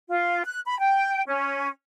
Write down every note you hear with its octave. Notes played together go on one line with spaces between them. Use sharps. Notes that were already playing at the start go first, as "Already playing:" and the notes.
F4
F#6
B5
G5
C#4